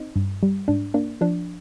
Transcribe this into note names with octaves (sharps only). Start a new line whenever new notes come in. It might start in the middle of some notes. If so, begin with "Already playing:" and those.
Already playing: C4 D#4
G2
G3
G#2 D4
A#3 D4
F3 D4